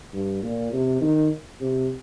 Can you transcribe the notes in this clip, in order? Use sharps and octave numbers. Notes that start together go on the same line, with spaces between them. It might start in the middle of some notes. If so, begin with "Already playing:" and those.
G2
A#2
C3
D#3
C3